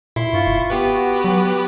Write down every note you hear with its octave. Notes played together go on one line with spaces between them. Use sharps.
A#2 E4 C6
G2 F4 C#6
F1
B3 G4 B4
F#4
F#3